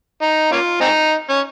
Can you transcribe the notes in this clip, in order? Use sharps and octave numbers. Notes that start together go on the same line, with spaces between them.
D#4
A#3 C#4 F4
G#3 C4 D#4
C#4